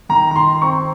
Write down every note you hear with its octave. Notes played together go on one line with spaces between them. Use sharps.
D#3 A#5
A#5
D#3 C6
C4 C#6